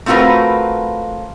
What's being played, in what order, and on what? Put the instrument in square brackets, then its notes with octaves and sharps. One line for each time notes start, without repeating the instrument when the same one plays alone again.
[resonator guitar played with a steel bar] A3 C4 F4 F#4 A#4 B4